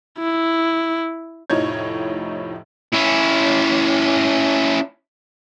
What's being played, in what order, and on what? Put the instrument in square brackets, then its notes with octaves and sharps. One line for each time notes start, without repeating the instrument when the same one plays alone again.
[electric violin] E4
[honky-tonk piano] F1 A2 F3 D#4 C#5 G#6
[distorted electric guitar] C#4 E4